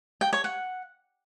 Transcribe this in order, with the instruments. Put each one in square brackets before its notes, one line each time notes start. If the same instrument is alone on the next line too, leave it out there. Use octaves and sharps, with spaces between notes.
[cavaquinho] G5
C#5
F#5